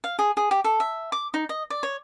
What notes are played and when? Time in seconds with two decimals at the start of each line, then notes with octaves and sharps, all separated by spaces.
0.04 F5
0.19 G#4
0.37 G#4
0.51 G4
0.64 A4
0.80 E5
1.12 D6
1.34 D#4
1.49 D#5
1.70 D5
1.83 C#5